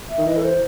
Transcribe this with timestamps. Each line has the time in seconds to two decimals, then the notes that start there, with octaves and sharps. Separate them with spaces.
0.09 E5
0.18 D#3
0.26 E3 D#5
0.36 A4
0.43 C5